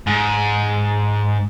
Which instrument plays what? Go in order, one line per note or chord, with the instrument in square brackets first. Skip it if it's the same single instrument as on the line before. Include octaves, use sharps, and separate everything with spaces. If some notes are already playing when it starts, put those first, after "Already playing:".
[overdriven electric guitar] G#2